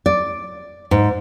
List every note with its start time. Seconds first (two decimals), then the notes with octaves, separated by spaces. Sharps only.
0.06 D5
0.91 G#2